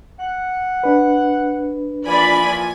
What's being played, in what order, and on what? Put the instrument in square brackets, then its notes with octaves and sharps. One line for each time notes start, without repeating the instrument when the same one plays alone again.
[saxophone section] F#5
[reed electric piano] D4 B4
[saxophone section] A#2 E3 F3 [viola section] D5 B5 [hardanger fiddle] G#5